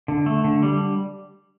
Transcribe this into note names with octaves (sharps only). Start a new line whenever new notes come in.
D3
A3
D3
G3